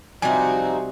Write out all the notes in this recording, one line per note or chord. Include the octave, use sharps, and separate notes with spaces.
C3 F3 G3 C4 D#4 F#4 G#5